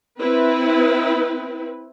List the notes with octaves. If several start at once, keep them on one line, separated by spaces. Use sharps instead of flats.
C4 E4 B4